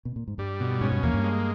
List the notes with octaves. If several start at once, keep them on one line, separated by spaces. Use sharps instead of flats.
B2
A#2
G#2
G2 G3
B2
G#2 C#4
G2
E2 A#3
G2
G#3